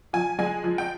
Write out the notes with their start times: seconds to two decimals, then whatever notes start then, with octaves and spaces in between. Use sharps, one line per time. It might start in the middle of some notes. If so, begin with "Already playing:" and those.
0.13 F3 G#5
0.39 G#3 G#5
0.64 F3
0.78 G5